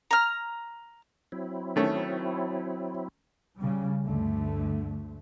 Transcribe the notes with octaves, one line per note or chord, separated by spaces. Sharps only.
A#5 F6
F#3 C4 E4
D#3 A3 C#4
C#3 G3
D2 G2 D3 A3